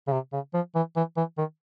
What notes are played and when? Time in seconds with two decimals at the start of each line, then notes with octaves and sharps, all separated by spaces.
0.08 C#3
0.13 C3
0.33 C#3
0.54 F3
0.75 E3
0.96 E3
1.17 E3
1.38 D#3